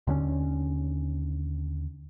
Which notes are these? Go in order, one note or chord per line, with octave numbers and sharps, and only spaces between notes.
D#2 D3 E3 C#4